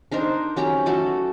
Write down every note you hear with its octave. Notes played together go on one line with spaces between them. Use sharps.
D4 D#4 A#4 C5
F#3 C#4 G4 A#5
A3 F#4 A4